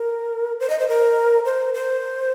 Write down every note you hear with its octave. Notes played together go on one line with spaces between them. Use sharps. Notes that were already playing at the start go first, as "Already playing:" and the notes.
Already playing: A#4
C5
D#5
C5
A#4
C5
C5